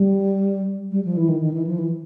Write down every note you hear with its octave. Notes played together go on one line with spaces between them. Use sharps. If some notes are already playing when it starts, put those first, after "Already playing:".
Already playing: G3
G3
F3
E3
D#3
D#3
E3
F3
E3